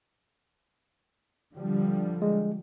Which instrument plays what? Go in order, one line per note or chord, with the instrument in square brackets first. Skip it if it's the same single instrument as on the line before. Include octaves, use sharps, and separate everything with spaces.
[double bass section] D3 F3 G3
[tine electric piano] G#3